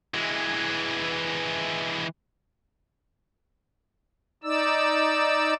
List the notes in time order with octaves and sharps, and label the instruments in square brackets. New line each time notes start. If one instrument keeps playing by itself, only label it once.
[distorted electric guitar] E3 G#3
[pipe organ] D#4 D5 E6